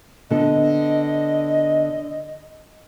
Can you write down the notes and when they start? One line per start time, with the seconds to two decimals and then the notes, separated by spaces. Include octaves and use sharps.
0.30 D3 B3 A4 D#5